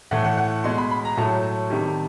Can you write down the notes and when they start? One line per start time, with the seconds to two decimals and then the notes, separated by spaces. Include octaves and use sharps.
0.11 A2 E3 A3 F#5
0.25 F#5
0.37 F#5
0.64 B2 G#3 C6
0.78 B5
0.91 B5
1.05 A#5
1.17 A2 F#3 A3 A5
1.70 C3 D#3 G3